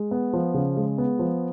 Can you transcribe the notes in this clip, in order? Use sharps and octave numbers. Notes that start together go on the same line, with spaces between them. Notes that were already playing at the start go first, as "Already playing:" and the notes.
Already playing: G#3
B3
F3
C#3
G#3
B3
F3